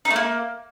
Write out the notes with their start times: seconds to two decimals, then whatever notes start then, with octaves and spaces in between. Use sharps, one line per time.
0.05 D#4
0.10 A3
0.16 A#3